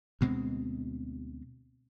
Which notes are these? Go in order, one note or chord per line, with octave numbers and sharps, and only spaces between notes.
D2 B2 G#3 C4